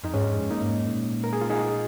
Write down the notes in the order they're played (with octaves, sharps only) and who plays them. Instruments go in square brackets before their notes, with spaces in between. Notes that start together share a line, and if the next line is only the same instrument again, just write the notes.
[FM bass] F2 [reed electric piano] D#4
[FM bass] G#2 [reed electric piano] G#3 C#4
[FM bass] F2
[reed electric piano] A#3 D#4
[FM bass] G#2
A#2
[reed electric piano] A#4
G#4
F4
D#4 G#4